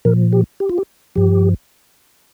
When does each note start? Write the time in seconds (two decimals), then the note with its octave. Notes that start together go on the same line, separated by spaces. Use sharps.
0.05 A#2 F3 A#4
0.33 G4
0.60 G4
0.69 F4
0.78 G4
1.15 G2 F3 G4